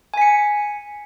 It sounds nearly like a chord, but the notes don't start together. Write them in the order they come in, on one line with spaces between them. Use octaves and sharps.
G#5 B6 C#7